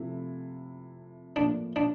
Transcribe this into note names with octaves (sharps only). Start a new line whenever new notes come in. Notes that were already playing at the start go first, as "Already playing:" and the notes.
Already playing: C3 F3 A3 E4
A2 F3 A#3 D4
D4